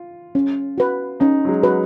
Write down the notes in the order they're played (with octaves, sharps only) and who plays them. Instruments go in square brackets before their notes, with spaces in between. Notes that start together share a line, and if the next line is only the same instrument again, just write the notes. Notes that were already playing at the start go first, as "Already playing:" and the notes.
Already playing: [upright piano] F4
[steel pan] C#4
F#4 B4
[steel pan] C#4 [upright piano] D#4
[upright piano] F#3
G#3
[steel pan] F#4 B4